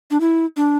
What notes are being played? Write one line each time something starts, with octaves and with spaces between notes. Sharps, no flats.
D4
E4
D4